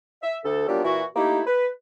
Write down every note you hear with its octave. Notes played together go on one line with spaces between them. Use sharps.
E5
D2 A4
F#3 G3 A#3 B3 D4 F4
A#2 E3 E4 F#4
A3 A#3 D#4 E4 G4
B4